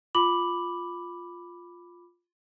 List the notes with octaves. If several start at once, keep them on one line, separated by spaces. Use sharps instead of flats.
F4 B5 D6 F#7